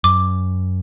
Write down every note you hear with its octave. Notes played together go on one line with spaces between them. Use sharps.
F#2 D6